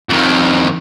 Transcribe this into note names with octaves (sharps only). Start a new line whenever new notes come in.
F2 D#3